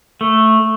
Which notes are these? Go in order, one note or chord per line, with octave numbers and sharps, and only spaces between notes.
A3